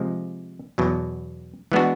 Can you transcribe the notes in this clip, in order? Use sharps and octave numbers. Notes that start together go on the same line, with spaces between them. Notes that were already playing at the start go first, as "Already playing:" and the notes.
Already playing: C3 F3 G#3
E2 B2 F#3
E3 G#3 B3 D4 F#4